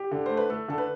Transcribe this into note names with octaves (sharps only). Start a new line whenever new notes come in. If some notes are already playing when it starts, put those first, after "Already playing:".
Already playing: G4
D3
A3 C5
B4
A3 A4
D3 A4
B4